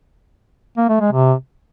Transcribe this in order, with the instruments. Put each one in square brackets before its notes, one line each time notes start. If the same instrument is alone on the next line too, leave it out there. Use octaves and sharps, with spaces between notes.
[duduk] A#3
A3
G#3
C3